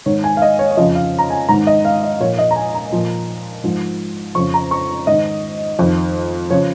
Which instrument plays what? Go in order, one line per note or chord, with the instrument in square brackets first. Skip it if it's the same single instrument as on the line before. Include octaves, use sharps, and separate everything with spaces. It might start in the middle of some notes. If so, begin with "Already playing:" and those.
[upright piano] G#2 D#3 C#5
G#5
F5
D#5
C#5
C#5
F2 C#3 F3 D#5
F5
A#5
G#5
G#2 D#3 A#5
D#5
F5
D#5
A#2 F3 C#5
D#5
A#5
G#5
A#5
A#2 F3
G#2 F3
F2 C#3 F3 C#6
A#5
C#6
G#2 D#3 D#5
F2 D#3
C#3 F3 C#5